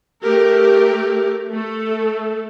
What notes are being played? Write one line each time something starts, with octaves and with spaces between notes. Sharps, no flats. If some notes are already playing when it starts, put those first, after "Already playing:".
A3 G4 A#4
A3 A4